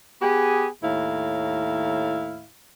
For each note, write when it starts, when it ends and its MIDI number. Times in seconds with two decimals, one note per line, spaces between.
0.22 0.68 59
0.22 0.68 67
0.22 0.68 68
0.83 2.46 39
0.83 2.46 45
0.83 2.46 64
0.83 2.46 77